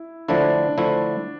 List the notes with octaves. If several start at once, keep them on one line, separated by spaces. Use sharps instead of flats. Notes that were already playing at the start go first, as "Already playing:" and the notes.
Already playing: E4
D3 F3 A3 D4 E4
D3 F3 A3 E4